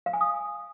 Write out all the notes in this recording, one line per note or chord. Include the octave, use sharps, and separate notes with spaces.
F5
G#5
D#6